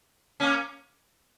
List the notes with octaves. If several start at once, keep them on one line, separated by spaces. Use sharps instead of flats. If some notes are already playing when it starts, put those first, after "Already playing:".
A#3 C#4